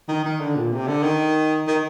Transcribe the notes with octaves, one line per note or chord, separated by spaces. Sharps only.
D#3
D#3
D3
A#2
C3
D3
D#3
D#3